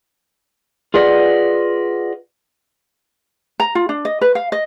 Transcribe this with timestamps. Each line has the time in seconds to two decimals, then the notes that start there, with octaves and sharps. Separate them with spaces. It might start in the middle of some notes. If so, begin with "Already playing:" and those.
0.94 F4 G#4 B4 D5 D#5 F#5
3.60 A#5
3.75 F4
3.89 D4
4.05 D#5
4.21 B4
4.35 F5
4.52 D#5